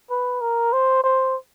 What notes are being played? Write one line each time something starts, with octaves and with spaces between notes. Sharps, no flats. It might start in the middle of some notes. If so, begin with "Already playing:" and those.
B4
A#4
C5
C5